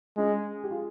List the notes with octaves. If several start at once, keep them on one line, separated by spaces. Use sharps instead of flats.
G#3 C#4 F4
G4
F4 G#4